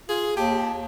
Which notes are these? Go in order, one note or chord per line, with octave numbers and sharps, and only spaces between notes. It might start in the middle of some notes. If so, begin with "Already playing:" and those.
F4 G#4
D#2 G4 A5